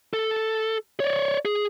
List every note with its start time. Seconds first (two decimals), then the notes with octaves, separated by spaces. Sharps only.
0.13 A4
1.00 C#5 D5
1.45 G#4